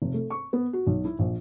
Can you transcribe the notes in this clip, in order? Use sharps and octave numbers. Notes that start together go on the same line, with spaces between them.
F1
A3
C#6
B3
F#4
B1
E4
A#1